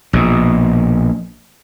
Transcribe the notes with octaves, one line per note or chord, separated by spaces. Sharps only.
A#1 B2